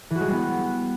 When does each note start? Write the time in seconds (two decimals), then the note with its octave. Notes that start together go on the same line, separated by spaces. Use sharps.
0.10 E3
0.16 F#4
0.21 G#3
0.26 G3
0.31 B3